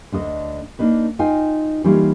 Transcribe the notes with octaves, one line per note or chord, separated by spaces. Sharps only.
D2 D3 D#5
A#3 D4 D#4 B4
D#4 F4 G5 G#5
E3 G3 A#3 D#4 F4 C#5